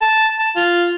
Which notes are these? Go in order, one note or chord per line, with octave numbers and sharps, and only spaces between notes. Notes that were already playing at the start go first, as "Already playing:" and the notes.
A5
A5
F4